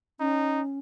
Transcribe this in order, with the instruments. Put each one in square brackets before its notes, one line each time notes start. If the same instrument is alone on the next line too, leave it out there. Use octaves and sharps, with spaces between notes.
[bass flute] C#4 [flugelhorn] D#4